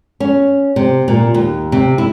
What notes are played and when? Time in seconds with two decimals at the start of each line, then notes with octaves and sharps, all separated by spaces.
0.20 C#4
0.76 C3
1.08 A#2
1.34 D#2
1.72 C3
1.98 E4